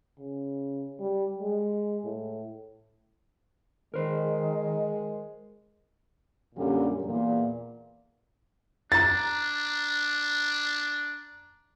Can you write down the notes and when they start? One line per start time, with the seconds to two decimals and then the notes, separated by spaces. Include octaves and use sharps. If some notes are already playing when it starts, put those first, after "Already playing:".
0.19 C#3
1.00 G3
1.41 G#3
2.04 A2
3.94 D#3 G#3 A#4 C5
6.55 F#2 A#2 D3 G3 G4
7.05 E2 A#2
8.92 D4 A#5 A6